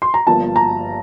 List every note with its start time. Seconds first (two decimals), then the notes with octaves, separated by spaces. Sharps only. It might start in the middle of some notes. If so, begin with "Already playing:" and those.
0.02 C6
0.14 A#5
0.27 G1 G2 F3 A#3 A5
0.56 A#5